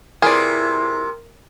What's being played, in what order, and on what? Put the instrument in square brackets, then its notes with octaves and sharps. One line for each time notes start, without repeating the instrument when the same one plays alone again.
[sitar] C3 A#3 F4 [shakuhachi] E4 [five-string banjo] G#4 B4 D5 [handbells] A#4